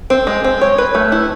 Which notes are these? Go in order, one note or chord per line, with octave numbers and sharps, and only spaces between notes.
C4
G#3
C4
C#5
B4
A3
E4